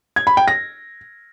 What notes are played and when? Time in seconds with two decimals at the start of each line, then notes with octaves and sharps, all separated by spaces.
0.16 G#6
0.27 B5
0.37 G5
0.48 A#6